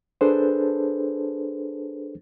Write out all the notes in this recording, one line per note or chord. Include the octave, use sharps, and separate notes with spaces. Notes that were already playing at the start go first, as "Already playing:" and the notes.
D4 G#4 A4 B4 C5